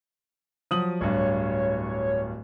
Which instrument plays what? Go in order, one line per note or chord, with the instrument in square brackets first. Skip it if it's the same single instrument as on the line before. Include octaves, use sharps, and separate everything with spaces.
[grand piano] F3 D#6 F#7 [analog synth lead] F#3
[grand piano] D1 G2 [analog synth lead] C#5